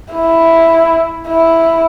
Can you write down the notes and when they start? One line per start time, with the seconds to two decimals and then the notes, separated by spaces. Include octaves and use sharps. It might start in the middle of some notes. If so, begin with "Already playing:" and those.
0.13 E4
1.28 E4